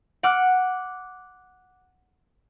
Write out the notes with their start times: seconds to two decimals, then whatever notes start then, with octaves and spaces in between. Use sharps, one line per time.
0.23 F#5 D6 F6 F#6